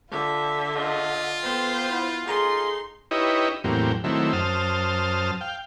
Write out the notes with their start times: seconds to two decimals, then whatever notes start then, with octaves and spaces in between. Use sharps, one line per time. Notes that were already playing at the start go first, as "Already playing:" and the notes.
0.11 D3 F4 E5
0.75 F4 D#5 F#5
1.43 B3 A4 C5 G5
1.88 E4 F#5
2.26 D#4 G#4 A4 C6
3.11 D#4 E4 G4 B4 C#5 D#5
3.64 E2 A2 F#3 A#3 C4 G4
4.04 D#3 F#3 A3 C4 E4
4.33 F#2 C5 A5 D#6 F6
5.41 F5 G5